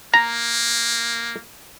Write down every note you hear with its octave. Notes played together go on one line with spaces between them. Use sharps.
A#3 A#5